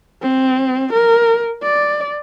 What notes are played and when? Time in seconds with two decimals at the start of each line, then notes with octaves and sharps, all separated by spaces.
0.22 C4
0.93 A#4
1.63 D5